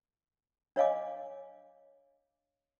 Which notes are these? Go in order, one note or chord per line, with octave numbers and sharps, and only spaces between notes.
D4 C#5 D#5 F5 G#5 D6